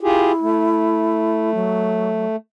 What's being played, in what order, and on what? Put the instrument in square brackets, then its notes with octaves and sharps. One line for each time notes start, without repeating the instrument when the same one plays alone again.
[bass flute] E4 [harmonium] F4 G4 G#4
[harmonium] A3
[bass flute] F#3